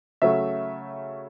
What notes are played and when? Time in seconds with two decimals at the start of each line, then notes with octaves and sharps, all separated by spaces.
0.22 C#3 F#3 A3 C#4 E5